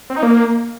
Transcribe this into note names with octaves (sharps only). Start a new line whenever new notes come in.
C4
D#4
A#3